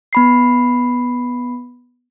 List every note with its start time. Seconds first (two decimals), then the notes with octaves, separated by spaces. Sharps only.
0.13 B3 B5 C7